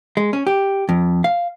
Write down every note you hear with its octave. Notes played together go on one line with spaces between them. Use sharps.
G#3
C#4
G4
F2
F5